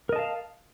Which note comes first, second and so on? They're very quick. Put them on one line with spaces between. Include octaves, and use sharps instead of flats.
A#4 D#5 A5 F5